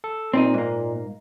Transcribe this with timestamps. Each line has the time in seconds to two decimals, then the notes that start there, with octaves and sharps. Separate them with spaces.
0.04 A4
0.33 A#2 C4 D4 D#4
0.54 G#2 A#3